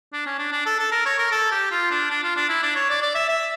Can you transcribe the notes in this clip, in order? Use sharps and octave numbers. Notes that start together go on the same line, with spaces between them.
D4
C#4
D4
D4
A4
A4
A#4
C#5
A#4
A4
G4
F4
D4
D4
F4
D4
E4
D4
C#5
D5
D5
E5
E5